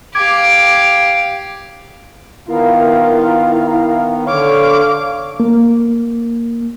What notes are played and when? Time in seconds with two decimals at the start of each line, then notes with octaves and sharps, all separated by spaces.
0.15 G4 F5 D6 G#6 D7
2.48 D#3 B3 E4 F4 A#4 F5
4.27 D3 C#5 F5 D6 F6
5.40 A#3